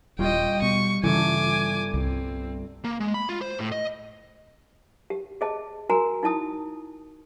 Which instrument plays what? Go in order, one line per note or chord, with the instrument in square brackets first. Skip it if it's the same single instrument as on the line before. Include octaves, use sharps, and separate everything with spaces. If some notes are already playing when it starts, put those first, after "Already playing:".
[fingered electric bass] D#1 [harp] G3 C#4 F4 [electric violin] D#5 G5
[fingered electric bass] B2 [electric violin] C#6
[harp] G1 E5 [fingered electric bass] C#3 E3 [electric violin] G#5 D6
[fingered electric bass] C2 [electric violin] C4
[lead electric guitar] A#3
G#3
B5
F4
C5
A2
D#5
[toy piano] G4
G#4 D#5 A5
F#4 A#4 G#5 A#5
D#4 E4 A5 D#6